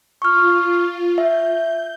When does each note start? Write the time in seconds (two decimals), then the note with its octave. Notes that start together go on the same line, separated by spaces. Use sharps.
0.22 F4 C#6 F6
1.18 E5 G6